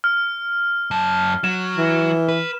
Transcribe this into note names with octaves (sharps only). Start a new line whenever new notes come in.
F6
F#2 A5
F#3 E7
E3
B4